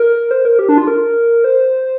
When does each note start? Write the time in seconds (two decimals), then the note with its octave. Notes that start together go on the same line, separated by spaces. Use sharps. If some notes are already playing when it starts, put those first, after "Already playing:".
Already playing: A#4
0.31 C5
0.45 A#4
0.59 G4
0.69 D4
0.78 F4
0.88 A#4
1.44 C5